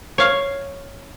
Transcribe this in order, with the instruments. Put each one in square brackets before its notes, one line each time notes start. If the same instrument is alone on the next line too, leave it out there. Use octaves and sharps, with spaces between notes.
[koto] C#5 F5